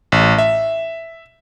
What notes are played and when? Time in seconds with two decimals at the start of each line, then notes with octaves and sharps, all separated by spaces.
0.12 A1
0.38 E5